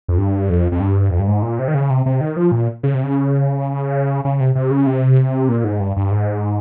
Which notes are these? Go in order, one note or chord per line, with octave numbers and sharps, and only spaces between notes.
F2
G2
F2
F2
G2
F2
G2
G#2
A#2
C3
D#3
C#3
C3
C3
D#3
F3
A#2
C#3
C3
C#3
C#3
C3
C3
C#3
C3
A#2
G#2
G2
G2
G#2